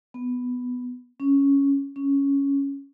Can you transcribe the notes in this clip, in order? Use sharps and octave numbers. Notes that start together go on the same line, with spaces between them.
B3
C#4
C#4